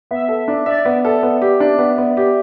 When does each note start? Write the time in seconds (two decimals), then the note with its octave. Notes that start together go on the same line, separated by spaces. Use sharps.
0.11 B3 E5
0.29 A4
0.48 D4
0.66 D5 E5
0.85 B3
1.05 A4
1.23 B3
1.42 G4
1.60 D4
1.78 B3
1.98 B3
2.17 G4